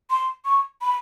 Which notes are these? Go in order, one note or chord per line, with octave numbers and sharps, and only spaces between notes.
C6
C#6
B5